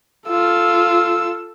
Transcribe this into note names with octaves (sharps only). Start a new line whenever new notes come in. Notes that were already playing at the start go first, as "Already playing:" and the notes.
F4 A4 E6